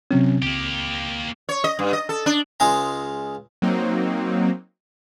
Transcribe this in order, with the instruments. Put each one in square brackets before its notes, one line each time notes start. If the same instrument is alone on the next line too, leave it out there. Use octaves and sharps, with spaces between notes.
[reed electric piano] C3 F#3 C#4 [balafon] C4
[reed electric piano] C#2 [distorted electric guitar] A#3 G4
[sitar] C#5
D#5
G2
D#5
A4
D4
[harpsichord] C#2 G#3 F4 G#4 F5 A#5
[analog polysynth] F#3 A#3 C4 D#4